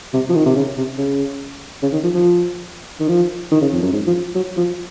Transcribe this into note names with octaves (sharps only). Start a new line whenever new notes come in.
C3
F3
D#3
C3
C#3
C3
C#3
C#3
D#3
F3
F3
D#3
F3
D#3
C#3
F2
F#2
G#2
F3
F#3
F3